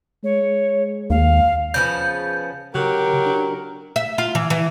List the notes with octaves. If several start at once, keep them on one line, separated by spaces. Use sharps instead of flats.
G#3 C#5
D#2 F5
C#3 F3 B3 G6
C#3 F#3 G4 A#4
D4
E5
F4
E3
E3